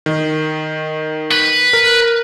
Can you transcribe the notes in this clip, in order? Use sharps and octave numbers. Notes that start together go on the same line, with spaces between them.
D#3
B4
A#4